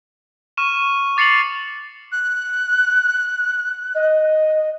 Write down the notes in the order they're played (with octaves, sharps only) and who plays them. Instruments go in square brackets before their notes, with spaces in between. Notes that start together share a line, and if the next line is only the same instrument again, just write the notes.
[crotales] C#6 F6 D#7 E7
D6 A6 C7 C#7 F7 F#7
[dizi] F#6
[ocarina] D#5